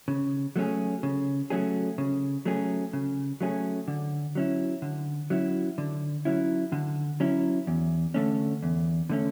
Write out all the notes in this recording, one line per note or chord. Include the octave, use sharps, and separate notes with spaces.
C#3
F#3 A3 C#4 G#4
C#3
F#3 A3 C#4 G#4
C#3
F#3 A3 C#4 G#4
C#3
F#3 A3 C#4 G#4
D3
F#3 C#4 E4
D3
F#3 C#4 E4
D3
F#3 C#4 E4
D3
F#3 C#4 E4
E2
D3 A3 C#4
E2
D3 A3 C#4